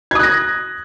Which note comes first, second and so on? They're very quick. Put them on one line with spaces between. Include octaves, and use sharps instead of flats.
G#6 D#6 F#6 A#6